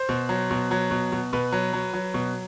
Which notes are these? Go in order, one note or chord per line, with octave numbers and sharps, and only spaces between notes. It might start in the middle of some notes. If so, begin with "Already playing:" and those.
Already playing: C5
B2
F#3
B2
F#3
B2
B2
B2 B4
F#3
F#3
F#3
B2